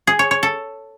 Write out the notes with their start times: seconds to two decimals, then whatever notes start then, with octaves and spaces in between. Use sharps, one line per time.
0.07 G#4
0.19 C#5
0.31 C#5
0.43 A4